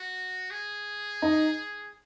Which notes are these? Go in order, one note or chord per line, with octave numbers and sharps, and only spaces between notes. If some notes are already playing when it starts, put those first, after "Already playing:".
Already playing: F#4
G#4
D#4